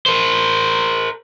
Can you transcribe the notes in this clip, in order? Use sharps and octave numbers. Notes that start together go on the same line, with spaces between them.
A#4 C5